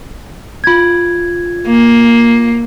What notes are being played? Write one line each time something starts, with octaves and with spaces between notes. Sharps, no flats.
F4 G#6
A#3